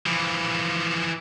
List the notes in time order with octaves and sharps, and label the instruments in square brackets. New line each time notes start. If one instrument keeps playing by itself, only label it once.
[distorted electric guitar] E3 F3